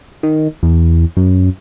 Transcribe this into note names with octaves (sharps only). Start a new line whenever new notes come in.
D#3
E2
F#2